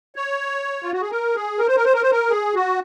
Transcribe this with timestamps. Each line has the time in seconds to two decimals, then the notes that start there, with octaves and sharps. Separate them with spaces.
0.16 C#5
0.83 F4
0.92 F#4
1.01 G#4
1.11 A#4
1.35 G#4
1.59 A#4
1.67 C5
1.76 A#4
1.85 C5
1.93 A#4
2.02 C5
2.11 A#4
2.30 G#4
2.55 F#4